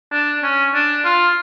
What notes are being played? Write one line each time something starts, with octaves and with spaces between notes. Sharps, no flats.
D4
C#4
D4
F4